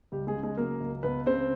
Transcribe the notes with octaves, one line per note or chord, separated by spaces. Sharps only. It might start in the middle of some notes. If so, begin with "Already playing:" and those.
C#2 G3 G4
G#3 G#4
C#3
G#3 G#4
F#3 A#3 A#4
C#2
C#2 B3 B4
C#3 C4 C5